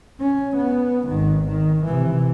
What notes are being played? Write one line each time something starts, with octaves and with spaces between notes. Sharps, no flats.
C#4
B3
G#1 D#3
D#3
C3 E3